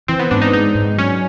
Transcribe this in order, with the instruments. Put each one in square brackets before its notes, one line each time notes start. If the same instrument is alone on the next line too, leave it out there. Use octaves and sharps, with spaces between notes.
[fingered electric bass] E3 [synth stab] C4
[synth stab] B3
[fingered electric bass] G#2 [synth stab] D4
[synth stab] D#4
[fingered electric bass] G#3 [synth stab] D#4
[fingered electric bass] G#2
[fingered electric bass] F#3 [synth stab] C#4